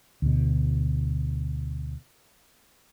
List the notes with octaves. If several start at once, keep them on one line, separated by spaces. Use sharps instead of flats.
D2 B2